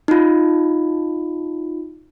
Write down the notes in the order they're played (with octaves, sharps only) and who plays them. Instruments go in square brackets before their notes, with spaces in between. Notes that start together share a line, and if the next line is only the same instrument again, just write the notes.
[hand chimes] D#4 F4